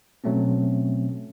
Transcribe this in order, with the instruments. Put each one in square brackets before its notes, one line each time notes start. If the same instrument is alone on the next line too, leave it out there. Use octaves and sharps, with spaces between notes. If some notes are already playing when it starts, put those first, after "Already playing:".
[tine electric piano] B2 F#3 A3 C4 C#4